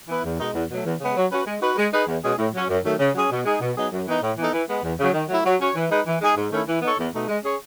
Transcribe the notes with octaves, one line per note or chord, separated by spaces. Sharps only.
E3 B3 E4 B4
E2
B2 G#3 D#4
E2
B2 F#3 A3
E2
C#3 G#3 B3
F#3
C#4 F#4 B4
G#3
D#4 F#4 B4
G#3
D#4 G#4 B4
E2
B2 G#3 C#4 G#4
A2
F#3 C#4
F#2
D#3 F#3 A3
C#3
F#3 C#4 G#4
B2
G#3 D#4 G#4
B2
F#3 B3 D#4 G#4
F#2
E3 B3 D#4
A2
E3 B3 D#4 A4
E3
G#3 B3
E2
C#3 F#3
D#3
F#3 A3 E4
F#3
C#4 F#4 C#5
E3
G#3 D#4 G#4 B4
E3
G#3 D#4 G#4
G#2
D#3 A3 C#4 E4
E3
B3 D#4 A4 C#5
E2
B2 A3 D#4
G#3
C#4 G#4 C#5